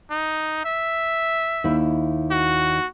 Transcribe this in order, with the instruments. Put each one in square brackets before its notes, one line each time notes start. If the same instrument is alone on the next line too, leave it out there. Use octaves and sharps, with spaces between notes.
[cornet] D#4
E5
[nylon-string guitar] D#2 E4
[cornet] F#4